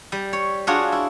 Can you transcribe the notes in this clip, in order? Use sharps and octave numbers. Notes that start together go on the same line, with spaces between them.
G3
C#5
D4 F4 F#4 G#4 C#5
E4